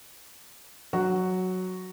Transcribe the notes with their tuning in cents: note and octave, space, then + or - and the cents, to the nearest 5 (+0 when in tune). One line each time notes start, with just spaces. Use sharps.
F#3 +0 F#4 +0